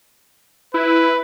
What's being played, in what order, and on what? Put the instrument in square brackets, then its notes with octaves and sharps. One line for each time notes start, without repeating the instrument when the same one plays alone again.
[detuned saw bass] E4 [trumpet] B4